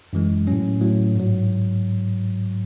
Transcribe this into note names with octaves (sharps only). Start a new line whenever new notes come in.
F#2 E3 G#3
A2 F#3 C#4
A2 F#3
G#2 F#3